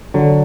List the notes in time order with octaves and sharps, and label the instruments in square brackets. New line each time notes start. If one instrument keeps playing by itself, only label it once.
[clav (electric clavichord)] D3 F#3